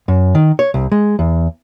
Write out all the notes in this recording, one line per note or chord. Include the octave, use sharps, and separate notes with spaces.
F#2
D#3
C#5
C2
G#3
E2